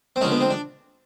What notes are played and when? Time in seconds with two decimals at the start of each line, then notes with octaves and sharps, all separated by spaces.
0.16 C4
0.21 D3 F3 G#3 C#4
0.31 B3
0.41 C4
0.51 D4